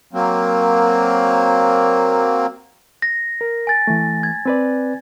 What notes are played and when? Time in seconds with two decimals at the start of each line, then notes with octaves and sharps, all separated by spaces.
0.13 F#3 A#3 C4
3.02 A#6
3.41 A#4
3.67 G#5 A6
3.87 E3 A3
4.23 G#6
4.46 C4 B4 D5